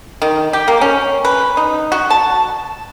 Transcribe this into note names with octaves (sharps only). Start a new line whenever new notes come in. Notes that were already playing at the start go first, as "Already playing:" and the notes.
D#3
G4
A#3
C#4
B4
D#4
F#4
A5